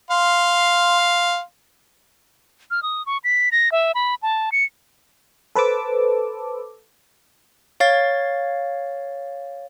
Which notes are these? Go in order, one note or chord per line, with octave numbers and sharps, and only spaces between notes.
F5 C6
F6
D#6
C#6
B6
A#6
E5
B5
A5
C#7
A4 B4 C5 A5 D6 E6
C#5 F5 A6